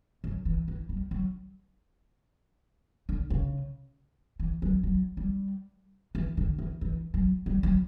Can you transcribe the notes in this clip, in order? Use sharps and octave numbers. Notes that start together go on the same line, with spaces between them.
F#2
E3
E3
G3
F#3
D3
C#3
E3
F#3
F#3
G3
E3
D3
E3
E3
F#3
G3
F#3